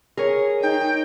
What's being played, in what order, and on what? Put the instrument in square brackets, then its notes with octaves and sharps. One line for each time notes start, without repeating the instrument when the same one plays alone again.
[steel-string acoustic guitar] G#4 [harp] A#4 C#5
[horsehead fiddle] D#4 [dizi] G5